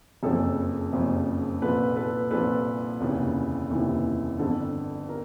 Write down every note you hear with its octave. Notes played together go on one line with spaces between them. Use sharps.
F#1 F2 C#3 F3 A4
F#1 F2 C#3 F3
C2 A#2 F3 A4 B4
A4 B4
C2 A#2 F3 A4 B4
F1 D#2 C#3 E3
F1 D#2 C#3 E3
G1 F2 D3 A4
A#4